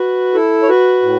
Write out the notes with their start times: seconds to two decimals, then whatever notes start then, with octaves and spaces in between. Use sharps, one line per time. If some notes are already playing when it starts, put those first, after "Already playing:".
Already playing: F#4 B4
0.34 E4 A4
0.63 C#5
0.69 F#4 B4
1.02 A2